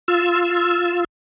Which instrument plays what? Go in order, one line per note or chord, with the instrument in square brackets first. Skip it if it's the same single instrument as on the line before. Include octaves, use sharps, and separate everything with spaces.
[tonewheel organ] F4 E6